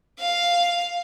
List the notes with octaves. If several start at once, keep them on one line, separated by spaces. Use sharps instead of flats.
F5